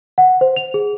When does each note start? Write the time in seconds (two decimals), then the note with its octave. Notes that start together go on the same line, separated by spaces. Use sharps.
0.18 F#5
0.41 C5
0.56 F7
0.74 G#4